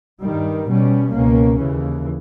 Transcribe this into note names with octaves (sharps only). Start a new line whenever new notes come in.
G2 D#3 G3
B2 G3 C#4
C#2 B2 A#3 C#4
D#2 C#3 E3